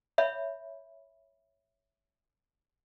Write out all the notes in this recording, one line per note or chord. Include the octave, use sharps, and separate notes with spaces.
C#5 E5 B5